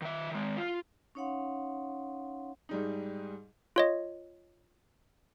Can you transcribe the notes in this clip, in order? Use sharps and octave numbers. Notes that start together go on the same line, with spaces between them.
D#3 E5
D#3 G#3
F4
C#4 D#4 C#5 F5 F#5 C6
G#2 G3 D#4
F4 C#5 D#5